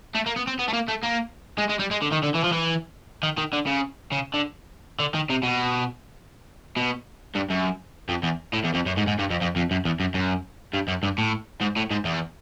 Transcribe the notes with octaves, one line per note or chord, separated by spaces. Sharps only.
A3
A#3
B3
C4
B3
A3
A#3
A3
A#3
G#3
G#3
G3
G#3
D3
D#3
D3
E3
F3
E3
D#3
D#3
D3
C#3
C#3
D3
D3
D#3
C3
B2
B2
G2
F#2
F2
E2
A2
E2
F2
F#2
G#2
G#2
G2
F2
F2
F2
F#2
E2
F#2
F#2
G2
F#2
G2
A2
G#2
A2
G#2
E2